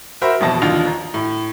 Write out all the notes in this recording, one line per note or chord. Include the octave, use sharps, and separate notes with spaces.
F#4 A#4 C5 E5 B5
D#1 A1 F2 B2 A5 A#6
A1 D#2 D3 F4 F7
A#5
A2